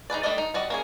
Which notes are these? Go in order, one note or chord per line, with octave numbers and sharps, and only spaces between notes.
D#4 G#4 B4 D5
G3 A3 D4 D5 D#5
D#4
G3 F#4 D5 D#5
A#3 C#4 G#4